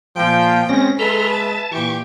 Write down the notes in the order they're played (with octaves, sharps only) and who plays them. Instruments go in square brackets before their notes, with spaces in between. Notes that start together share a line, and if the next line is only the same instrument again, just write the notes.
[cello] A#2 G5 [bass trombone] F3
[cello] G#3 [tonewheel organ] C4 A#6 [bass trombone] C#4
[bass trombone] G#3 [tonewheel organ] A4 A#5 C6 [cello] B4 E5
[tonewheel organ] A5
[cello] A#2 G4 [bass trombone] E3 [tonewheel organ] C#6